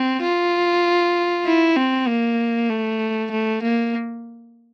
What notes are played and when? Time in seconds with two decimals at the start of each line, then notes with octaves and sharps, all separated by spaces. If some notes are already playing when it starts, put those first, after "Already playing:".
Already playing: C4
0.23 F4
1.46 E4
1.77 C4
2.08 A#3
2.70 A3
3.31 A3
3.63 A#3